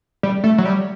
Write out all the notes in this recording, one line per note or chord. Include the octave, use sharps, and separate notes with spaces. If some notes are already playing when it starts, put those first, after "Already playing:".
G3
A3
F#3
G3